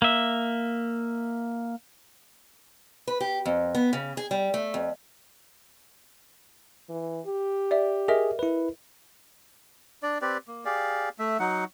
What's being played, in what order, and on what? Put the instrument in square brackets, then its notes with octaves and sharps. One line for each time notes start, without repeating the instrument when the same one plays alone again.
[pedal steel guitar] A#3 E5
[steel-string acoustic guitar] B4
G4
F2
B3
C#3
G#4
G3
A3
F2
[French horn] E3
G4
[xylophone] D5 E5
[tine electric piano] G#4 [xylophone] A#4 D#5 E5
[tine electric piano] E4 B4
[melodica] D4 D5
C4 G4 B4 D5
A#3
G4 G#4 D5 F5
A3 E5
F#3 D#4 F#5